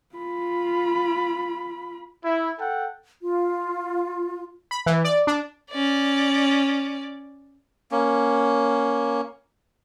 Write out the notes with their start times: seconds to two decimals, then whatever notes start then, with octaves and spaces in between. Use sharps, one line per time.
0.15 F4 B5
2.24 E4
2.59 A4 F#5 G5
3.22 F4
4.71 B5
4.86 E3
5.04 D5
5.27 D4
5.71 C#4 D5
7.91 A#3 C#4